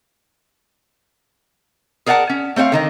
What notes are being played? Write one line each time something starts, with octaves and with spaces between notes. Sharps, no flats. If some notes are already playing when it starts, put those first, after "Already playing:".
G#4 A#4 D5 F5 F#5 A5
C#4
A3 C4 C#5 E5 F5
D3 D#3 D#5